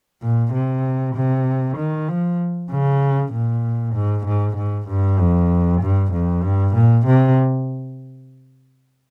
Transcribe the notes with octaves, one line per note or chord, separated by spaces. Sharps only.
A#2
C3
C3
D#3
F3
C#3
A#2
G#2
G#2
G#2
G2
F2
G2
F2
G2
A#2
C3